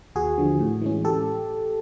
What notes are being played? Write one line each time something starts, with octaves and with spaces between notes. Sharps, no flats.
D#2 F#4 G#4
D3 F3
A2
E3 G#3 C#4
G4 A4